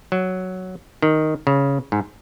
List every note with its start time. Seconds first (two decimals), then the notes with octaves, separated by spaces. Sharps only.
0.12 F#3
1.02 D#3
1.47 C#3
1.92 G#2